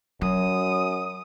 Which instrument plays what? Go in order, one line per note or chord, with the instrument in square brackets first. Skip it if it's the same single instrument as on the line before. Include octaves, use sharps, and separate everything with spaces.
[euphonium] F#2 [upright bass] F#3 [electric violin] D#6